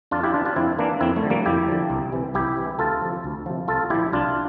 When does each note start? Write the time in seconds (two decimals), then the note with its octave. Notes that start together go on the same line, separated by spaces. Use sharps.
0.11 F2 D4 F4
0.23 E4 G4
0.34 E3 D4 F4
0.45 D4 F4
0.56 F2 C4 E4
0.79 E3 A#3 D4
1.01 F2 C4 E4
1.16 A3
1.23 D3 F3
1.30 G3 A#3
1.46 F2 E4 G4
1.69 D3 F3
1.90 C2
2.12 C3 E3
2.34 C2 E4 G4
2.57 C3 E3
2.79 D2 F4 A4
3.02 C3 F3
3.24 D2
3.46 C3 F3
3.68 C2 F4 A4
3.90 A#2 F3 E4 G4
4.12 C2 D4 F4